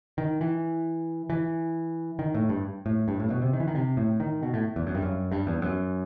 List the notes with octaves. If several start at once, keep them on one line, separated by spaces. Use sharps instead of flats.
D#3
E3
E3
D#3
A2
G2
A2
G2
A2
B2
C3
D#3
E3
D#3
C3
A2
D#3
B2
A2
E2
F#2
G2
F#2
G2
E2
F#2